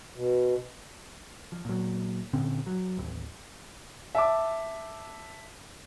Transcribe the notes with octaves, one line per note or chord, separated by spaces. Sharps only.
B2
F3
A#2 F#3
A#2 D3 C4 C#4
F#3
A1 D#2
E5 A5 D6